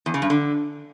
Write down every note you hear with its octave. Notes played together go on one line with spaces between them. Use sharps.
E2
C#3
G2
D3